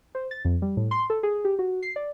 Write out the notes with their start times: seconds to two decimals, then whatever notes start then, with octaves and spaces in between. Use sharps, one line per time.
0.15 C5
0.31 A6
0.45 F2
0.62 G3
0.77 A2
0.91 C6
1.10 A4
1.23 G#4
1.45 G4
1.59 F#4
1.83 C7
1.96 D5